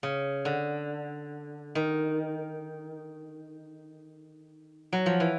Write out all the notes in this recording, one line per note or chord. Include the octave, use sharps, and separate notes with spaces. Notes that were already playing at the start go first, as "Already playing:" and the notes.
C#3
D3
D#3
F#3
F3
E3